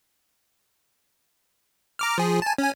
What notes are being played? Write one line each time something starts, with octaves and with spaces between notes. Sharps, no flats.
A#5 D6 F6
F3 G#4
G#5 A5
C#4 G#5